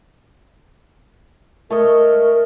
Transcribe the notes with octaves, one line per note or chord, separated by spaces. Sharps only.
A3 A#4 C#5 D#5